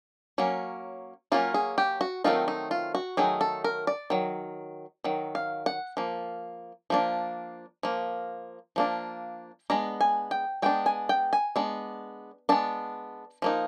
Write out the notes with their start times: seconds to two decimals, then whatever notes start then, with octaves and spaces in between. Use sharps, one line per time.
0.38 F#3 A#3 C#4
1.32 F#3 A#3 C#4 F4
1.54 G#4
1.78 G4
2.01 F#4
2.24 D#3 F#3 A3 C4 D#4 F4
2.48 D#4
2.71 F4
2.95 F#4
3.17 D#3 F#3 A3 D#4 G#4
3.41 A4
3.64 A#4
3.87 D5
4.10 D#3 F#3
5.04 D#3 F#3
5.35 F5
5.66 F#5
5.97 F3 A#3
6.90 F3 A#3 D4
7.83 F3 A#3
8.76 F3 A#3 D4
9.70 G#3 B3 D4 A#5
10.01 G#5
10.31 G5
10.62 G#3 B3 D4 G5
10.86 G#5
11.09 G5
11.33 G#5
11.56 G#3 B3 D4
12.49 G#3 B3 D4 A5
13.42 F3 A#3 D#4